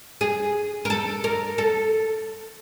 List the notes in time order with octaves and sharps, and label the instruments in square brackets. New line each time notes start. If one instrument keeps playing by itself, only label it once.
[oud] G#4
A#4
A4
A#4
A4